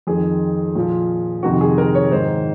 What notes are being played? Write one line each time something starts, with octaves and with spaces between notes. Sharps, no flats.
F2 D#3 G#4
A#2 F3
F2 C3 D#3 F#4
G#4
A#4
C#5
G#2 D#3 C5